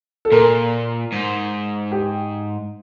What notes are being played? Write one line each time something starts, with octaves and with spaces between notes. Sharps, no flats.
A4
A#2 A#4
G#2
G4